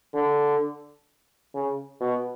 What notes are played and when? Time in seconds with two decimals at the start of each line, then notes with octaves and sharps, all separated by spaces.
0.14 D3
1.54 C#3
2.01 B2